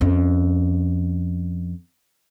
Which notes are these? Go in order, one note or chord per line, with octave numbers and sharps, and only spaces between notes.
F2 C#4